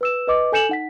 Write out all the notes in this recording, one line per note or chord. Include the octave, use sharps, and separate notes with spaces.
B4 E6 E7
B4 D#5 D6
A4 G#5 G6 C#7 E7 F#7
D#4 F#5 B6